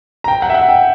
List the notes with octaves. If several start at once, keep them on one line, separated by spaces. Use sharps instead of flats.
A#5
G5
F#5
E5
F#5
G5